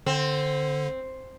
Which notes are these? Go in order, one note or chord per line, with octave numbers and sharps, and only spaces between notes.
D3 C4